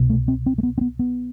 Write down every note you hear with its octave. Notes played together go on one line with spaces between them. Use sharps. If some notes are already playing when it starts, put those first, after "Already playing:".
Already playing: C2 B2
A3
C4
C4
A3
B3
C4
B3
B3